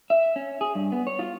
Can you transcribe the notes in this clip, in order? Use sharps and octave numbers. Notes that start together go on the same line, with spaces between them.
E5
C#4
G#4
G2
B3
C#5
F4